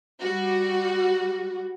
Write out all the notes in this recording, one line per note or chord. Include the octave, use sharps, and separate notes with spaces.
G3 F#4